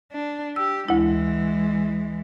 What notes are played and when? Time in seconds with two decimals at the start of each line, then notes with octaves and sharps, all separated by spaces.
0.12 D4
0.56 G4 E6
0.88 D2 E3 G#3 E4